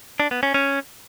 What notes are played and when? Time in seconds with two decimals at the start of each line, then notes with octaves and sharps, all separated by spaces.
0.20 D4
0.31 B3
0.43 C#4
0.54 C#4